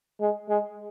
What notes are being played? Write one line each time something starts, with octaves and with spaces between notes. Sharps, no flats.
G#3
G#3